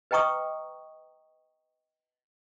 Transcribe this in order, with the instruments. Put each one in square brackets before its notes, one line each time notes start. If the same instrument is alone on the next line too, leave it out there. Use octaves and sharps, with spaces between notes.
[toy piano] B4 D#5 G5 A#5 C#6 D#6